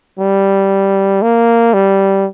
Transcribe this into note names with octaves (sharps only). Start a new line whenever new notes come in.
G3
A#3
G3